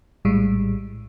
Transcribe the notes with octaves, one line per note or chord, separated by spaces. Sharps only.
A#1 A2 G3 G#3